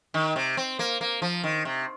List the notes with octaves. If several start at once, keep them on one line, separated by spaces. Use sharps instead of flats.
D#3
C3
C4
A#3
A#3
F3
D#3
C3